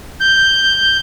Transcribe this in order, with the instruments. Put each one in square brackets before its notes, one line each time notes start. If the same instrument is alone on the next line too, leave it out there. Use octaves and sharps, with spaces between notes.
[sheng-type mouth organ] G6